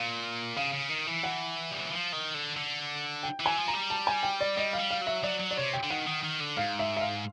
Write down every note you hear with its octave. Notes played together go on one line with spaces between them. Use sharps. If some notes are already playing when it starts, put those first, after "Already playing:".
Already playing: A#2 F5
C#3 F5
C#3
D#3
E3
F#5
G3
F#3
F3
D#3
D3
D3
G5
E3
G#5
F3
A#5
G3
A5
G#5
G5
D5
G3 D#5
F5
G3
F5
F#3
E5
F#3 D5
F#3
D5
C3 C#5
G5
D3
D#3 F#5
D#3
D#3
D3
G#2 F5
E5
E5
F5